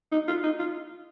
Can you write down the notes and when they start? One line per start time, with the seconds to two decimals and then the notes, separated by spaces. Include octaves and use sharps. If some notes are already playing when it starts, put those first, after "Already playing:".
0.12 D#4
0.28 F4
0.43 D#4
0.59 F4